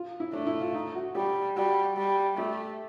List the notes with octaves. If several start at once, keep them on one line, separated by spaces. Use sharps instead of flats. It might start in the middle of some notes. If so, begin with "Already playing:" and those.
Already playing: F4
E4
A3 D4
E4
F4
D#4
F#4
G3 G4
G3 F#4
G3
A3 G4